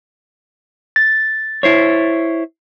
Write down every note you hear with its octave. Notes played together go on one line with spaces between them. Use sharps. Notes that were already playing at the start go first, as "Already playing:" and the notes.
A6
E4 C5 C#5